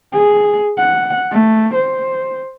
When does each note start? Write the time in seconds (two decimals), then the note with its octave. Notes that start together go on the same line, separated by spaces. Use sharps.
0.13 G#4
0.78 F#5
1.31 A3
1.74 C5